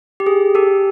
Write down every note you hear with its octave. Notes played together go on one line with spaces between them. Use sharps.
G4
G#4
G4 A4